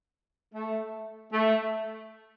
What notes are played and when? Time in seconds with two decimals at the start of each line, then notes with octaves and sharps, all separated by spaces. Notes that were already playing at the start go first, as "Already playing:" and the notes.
0.54 A3
1.32 A3